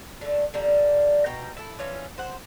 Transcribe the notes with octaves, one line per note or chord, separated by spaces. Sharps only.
D3 A3
D3 G3 A#3
B2 G5 A#5
E4 A4
E3 C#4 F4
C5 F#5